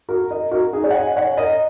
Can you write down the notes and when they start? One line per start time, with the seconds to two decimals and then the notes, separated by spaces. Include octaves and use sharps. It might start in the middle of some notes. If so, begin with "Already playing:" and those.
0.09 F#4 A#4
0.31 A#4 D#5
0.51 F#4 A#4
0.73 D#4 G#4
0.84 G#4 C#5
0.91 F#5
0.94 D#5 G#5
1.16 C#5 F#5
1.37 A#4 D#5